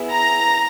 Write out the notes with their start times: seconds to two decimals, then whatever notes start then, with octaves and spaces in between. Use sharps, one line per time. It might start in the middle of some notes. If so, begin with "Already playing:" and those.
Already playing: B3 E4 G#4
0.09 A#5